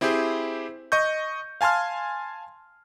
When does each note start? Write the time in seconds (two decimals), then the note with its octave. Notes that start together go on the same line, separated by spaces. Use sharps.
0.01 C4 E4 G4 G#4 C5
0.92 D#5 C#6 G6
1.61 F5 G#5 A5 C6 F6